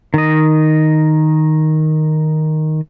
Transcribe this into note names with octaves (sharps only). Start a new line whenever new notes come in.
D#3 D#5